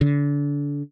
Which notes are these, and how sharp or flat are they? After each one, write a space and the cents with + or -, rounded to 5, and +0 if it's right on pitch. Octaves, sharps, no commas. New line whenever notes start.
D3 -30